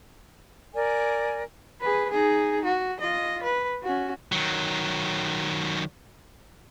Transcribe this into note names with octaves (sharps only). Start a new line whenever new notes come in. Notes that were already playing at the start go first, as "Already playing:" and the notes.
A#4 D5 G#5
G#4 B4
D#4 G#4
F#4
F4 D#5
B4
C#4 F#4
D#3 F#3